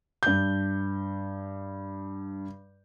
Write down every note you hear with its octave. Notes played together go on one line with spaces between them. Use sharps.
G2 G6